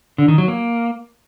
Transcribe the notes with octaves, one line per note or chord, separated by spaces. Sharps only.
D3
D#3
F#3
A#3